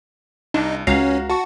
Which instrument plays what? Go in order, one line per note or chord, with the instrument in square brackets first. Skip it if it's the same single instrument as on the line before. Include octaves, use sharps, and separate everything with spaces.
[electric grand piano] C2 [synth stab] D4 [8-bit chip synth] D#4
[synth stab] C#2 F5 A#5 [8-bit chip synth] C#4 [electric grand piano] F#4
[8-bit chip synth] F#4 [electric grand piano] A5 C#6